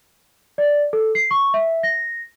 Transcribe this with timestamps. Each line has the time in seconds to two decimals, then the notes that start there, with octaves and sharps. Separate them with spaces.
0.58 D5
0.93 A4
1.15 C7
1.31 C#6
1.54 E5
1.83 A#6